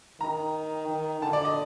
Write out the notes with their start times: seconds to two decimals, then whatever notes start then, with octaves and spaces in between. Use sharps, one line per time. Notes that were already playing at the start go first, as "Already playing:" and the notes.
0.21 D#3 A#5
0.89 D#3
1.22 D3 A5
1.33 D5
1.45 D#5